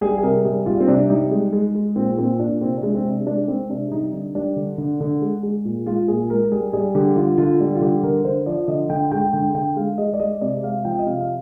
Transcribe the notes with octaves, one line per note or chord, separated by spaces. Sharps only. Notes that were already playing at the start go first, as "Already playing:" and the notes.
G3 G#4
G#4
C3 A#4
G3 G#4
G3 F4
C4
C3 D4
G3 D#4
G#3
G#3
G#3
A#2 C4
A#2 C4
A#2 D4
C3 C4
D4
G#3
C4
C3
D4
G#3 D4
G#3 C4
C3 D4
G3 D#4
D3 D4
G3 D4
D3
D3
D3
G#3
G#3
A#2
G#3 F4
A#2 G#4
G#3 A#4
G3 G#4
G3 G#4
D3 G4
D3 F4
D3 F4
G3
F4
D3 G4
D3 A#4
D3 C5
F3 D5
D3 D#5
D3 G5
G#3 G5
D3 G5
D3 G5
G#3 F5
G#3 D#5
D5
G#3 D#5
C3 D5
G#3 F5
F3 G5
D#5
C3 F5
F5